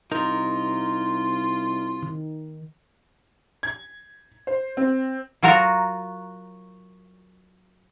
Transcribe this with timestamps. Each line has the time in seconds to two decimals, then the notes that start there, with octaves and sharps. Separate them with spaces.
0.12 C2 D#4 F4 A#4
2.03 D#3
3.63 G#6
4.47 C5
4.77 C4
5.43 F#3 F4 F#4 A#4 A#5